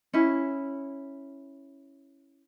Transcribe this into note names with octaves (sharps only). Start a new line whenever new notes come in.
C#4 E4